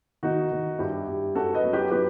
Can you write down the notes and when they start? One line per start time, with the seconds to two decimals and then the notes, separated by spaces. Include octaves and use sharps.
0.23 D#3 D#4 F#4
0.52 D#3
0.79 G2 E4 G4
1.07 G2
1.35 F#2 F#4 A4
1.54 B4 D#5
1.64 F#3
1.72 G4 B4
1.91 F#3 G4 B4